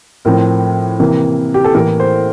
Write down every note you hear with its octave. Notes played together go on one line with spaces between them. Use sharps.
A2 F3 C4 A#4
C3 E3 A#3
G4
A4
A2 E3 A#3 A#4
C5